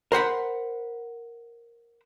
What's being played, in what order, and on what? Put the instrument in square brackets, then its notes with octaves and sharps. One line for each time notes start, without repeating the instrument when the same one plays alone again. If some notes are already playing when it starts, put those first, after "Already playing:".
[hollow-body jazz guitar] A#4 C5 F#5 B5